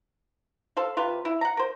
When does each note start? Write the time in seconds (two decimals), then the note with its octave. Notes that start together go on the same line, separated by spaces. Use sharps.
0.77 A4 C5 F5
0.97 C3 F4 B4
1.25 E4
1.41 F#5 A#5
1.57 A#4 C5